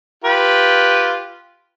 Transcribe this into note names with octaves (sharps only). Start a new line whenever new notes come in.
F4 G4 B4